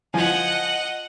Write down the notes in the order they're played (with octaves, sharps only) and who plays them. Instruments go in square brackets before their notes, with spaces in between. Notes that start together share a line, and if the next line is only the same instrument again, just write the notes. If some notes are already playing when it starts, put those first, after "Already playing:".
[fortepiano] F3 G#5 [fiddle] D#5 F#5